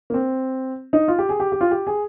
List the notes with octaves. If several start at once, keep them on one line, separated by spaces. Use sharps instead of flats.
A#3
C4
D#4
F4
G4
G#4
G4
G4
F4
G4
G#4